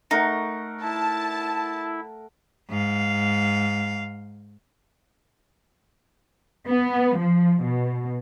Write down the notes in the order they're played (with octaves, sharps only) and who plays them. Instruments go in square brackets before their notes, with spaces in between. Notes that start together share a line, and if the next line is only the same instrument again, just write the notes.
[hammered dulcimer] A3 A#4 F#5 [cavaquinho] D#4
[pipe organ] E4 [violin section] A5
[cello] G#2 F5
[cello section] B3
F3
B2